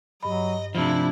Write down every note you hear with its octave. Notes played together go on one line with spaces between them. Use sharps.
G2 F#3 D#5 B5
C3 F3 D4 E4